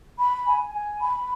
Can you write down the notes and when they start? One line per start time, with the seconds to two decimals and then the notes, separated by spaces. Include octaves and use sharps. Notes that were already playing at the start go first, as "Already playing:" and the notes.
0.18 B5
0.46 G#5
0.72 G#5
1.01 B5